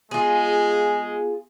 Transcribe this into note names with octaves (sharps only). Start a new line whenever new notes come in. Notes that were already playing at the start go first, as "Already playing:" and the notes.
G#3 B3 F4 G#4